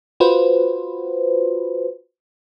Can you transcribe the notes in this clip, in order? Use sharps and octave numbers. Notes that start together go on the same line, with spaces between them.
F4 F#4 B4 C5